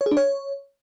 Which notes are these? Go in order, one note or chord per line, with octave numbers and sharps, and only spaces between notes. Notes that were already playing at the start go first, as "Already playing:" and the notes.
C#5
G#4
D4
C#5